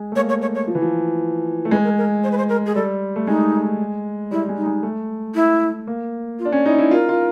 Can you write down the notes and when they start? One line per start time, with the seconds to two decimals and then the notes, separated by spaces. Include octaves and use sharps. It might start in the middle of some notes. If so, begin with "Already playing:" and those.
Already playing: G#3
0.12 A3
0.16 A#3 C#5
0.29 C#5
0.42 C#5
0.55 C#5
0.68 F3
0.75 E3
0.82 F3
1.65 A3
1.71 G#3 B4
1.84 A#4
1.97 A#4
2.23 C5
2.31 B4
2.38 C5
2.49 A#4
2.66 G#4
2.75 G3 A4
3.16 A3
3.27 G#3 D#4
4.31 G3 E4
4.49 G#3
4.57 D#4
4.66 G#3
4.83 A3
5.35 E4
5.87 A#3
6.39 F4
6.45 D4
6.52 C#4
6.66 D#4 E4
6.79 E4
6.91 F4 A#4
7.09 F4